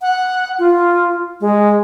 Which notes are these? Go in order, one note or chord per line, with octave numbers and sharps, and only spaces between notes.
F#5
F4
G#3